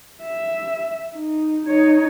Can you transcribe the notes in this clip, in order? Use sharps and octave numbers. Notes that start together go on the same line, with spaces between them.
E5
D#4
D#4 C#5